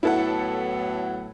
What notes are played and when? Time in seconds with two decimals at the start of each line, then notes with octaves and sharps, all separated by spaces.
0.03 A2 F#3 B3 E4 A4 F#5